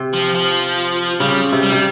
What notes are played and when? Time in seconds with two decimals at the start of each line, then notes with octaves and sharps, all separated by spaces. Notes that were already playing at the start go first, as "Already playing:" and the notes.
Already playing: C3
0.13 F3
0.35 F3
1.20 C#3 G3
1.52 C3
1.63 G3
1.72 C3